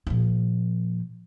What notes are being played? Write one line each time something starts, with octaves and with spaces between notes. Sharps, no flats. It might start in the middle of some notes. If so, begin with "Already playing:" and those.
A#2 F3